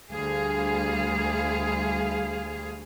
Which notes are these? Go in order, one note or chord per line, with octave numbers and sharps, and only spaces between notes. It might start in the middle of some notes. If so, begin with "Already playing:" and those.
D2 G3 G#4 F5